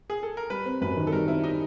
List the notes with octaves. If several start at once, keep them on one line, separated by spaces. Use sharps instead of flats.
G#4
A4
A#4
G3 B4
C4
F#2 B4
D#3
A4
G3 A#4
C4 E4
D#4